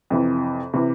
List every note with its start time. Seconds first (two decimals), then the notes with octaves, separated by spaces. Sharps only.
0.10 F2 C3 E3
0.73 C3 E3